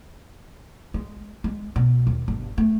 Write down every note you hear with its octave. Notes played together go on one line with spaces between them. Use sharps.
G#3
G#3
B2
D#2
G1
A3